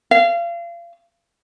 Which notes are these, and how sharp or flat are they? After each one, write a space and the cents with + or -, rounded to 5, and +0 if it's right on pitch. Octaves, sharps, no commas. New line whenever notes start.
F5 -30